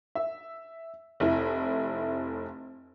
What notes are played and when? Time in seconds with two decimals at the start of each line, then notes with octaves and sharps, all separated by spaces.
0.15 E5
1.20 F1 E4